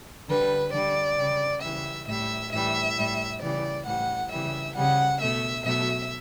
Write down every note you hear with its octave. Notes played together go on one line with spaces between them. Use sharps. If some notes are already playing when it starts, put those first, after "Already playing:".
D3 G3 B4
D3 G3 D5
C#3 G3
C#3 E3 G3 E5
A2 G3 E5
A2 E3 G3 E5
A2 G3
C#3 E3 G3 D5
A2 E3 G3 F#5
C#3 E3 G3 E5
C#3 G3 F#5
B2 A3 E5
B2 F#3 A3 E5